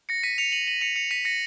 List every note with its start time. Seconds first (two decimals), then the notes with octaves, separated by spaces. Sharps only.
0.09 A#6 C#7
0.23 B6 D#7
0.38 C#7 F7
0.52 D#7 F#7
0.67 D#7 F#7
0.81 C#7 F7
0.96 C#7 F7
1.11 B6 D#7
1.25 A#6 C#7